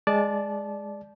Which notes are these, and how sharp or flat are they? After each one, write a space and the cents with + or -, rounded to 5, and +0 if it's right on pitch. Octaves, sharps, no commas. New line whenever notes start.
G#3 +0 D5 +0 A5 -25